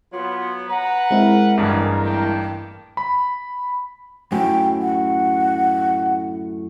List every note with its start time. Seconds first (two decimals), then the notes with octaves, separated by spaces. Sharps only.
0.13 F#3 B3 F4
0.69 B4 F#5 A#5
1.11 G#3 C4 E4 A#4
1.58 A1 G2 G4 G#4
2.04 A#3 G5 A5
2.97 B5
4.32 F#2 A2 G5
4.81 F#5